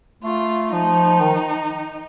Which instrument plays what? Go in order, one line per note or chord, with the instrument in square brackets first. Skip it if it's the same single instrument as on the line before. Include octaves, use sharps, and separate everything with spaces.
[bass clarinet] A3 [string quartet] F4
[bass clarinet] F3 [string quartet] D#4
[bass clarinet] D#3